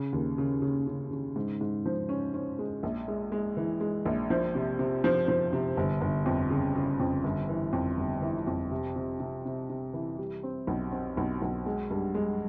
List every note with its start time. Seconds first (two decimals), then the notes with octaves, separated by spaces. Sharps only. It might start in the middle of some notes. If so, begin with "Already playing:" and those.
Already playing: C#3
0.13 D#2
0.38 C#3
0.62 C#3
0.87 C#3
1.11 C#3
1.36 G#2
1.61 G#2
1.86 F3
2.09 C#4
2.34 C#4
2.59 G#3
2.83 A#1
3.08 G#3
3.32 G#3
3.57 E3
3.80 G#3
4.06 A#1
4.30 F3
4.55 C3
4.79 C3
5.04 F3
5.28 F3
5.53 C3
5.77 G1
6.01 G1
6.26 F2
6.50 C#3
6.76 C#3
7.00 F2
7.24 G1
7.49 E3
7.73 F2
7.98 G1
8.22 E3
8.47 F2
8.71 C3
8.96 C3
9.20 C3
9.46 C3
9.69 C3
9.93 E3
10.18 G3
10.43 C4
10.67 B1
10.92 C4
11.17 B1
11.42 B1
11.66 G#3
11.91 G2
12.15 G#3